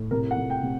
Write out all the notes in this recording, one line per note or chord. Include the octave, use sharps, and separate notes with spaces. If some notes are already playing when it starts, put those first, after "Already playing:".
Already playing: A2
C3 A#4
F#5
C3
G5
C3